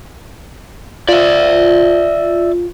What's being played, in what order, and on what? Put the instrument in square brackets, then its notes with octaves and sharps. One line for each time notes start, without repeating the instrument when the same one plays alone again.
[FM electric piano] F4 [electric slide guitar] D5 E5